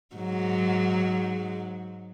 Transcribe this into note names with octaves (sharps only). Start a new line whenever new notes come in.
G#2 F#3